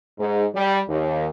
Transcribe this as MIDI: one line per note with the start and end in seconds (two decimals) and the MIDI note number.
0.18 0.45 44
0.55 0.80 55
0.89 1.27 39